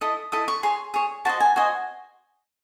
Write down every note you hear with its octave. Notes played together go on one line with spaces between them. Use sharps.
E4 A4 D#5 D#6
E4 A4 D#5 D#6
C#6
G#4 C#5 C6
G#4 C#5
F#4 C5 D#5 A5
G#5
F#4 C5 D#5 G#5